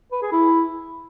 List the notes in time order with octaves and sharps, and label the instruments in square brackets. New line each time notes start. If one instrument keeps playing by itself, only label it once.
[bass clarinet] B4
G#4
E4